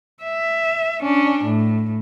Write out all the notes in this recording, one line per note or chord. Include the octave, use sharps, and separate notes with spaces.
E5
C#4 D4
A2